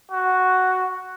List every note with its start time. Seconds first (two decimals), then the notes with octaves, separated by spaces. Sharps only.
0.11 F#4